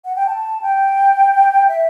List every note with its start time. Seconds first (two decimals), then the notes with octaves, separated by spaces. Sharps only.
0.05 F#5
0.16 G5
0.26 A5
0.62 G5
1.68 E5